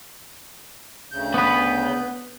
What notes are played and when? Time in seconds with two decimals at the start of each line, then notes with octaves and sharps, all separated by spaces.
1.12 D2 C#3 G6
1.34 B3 B4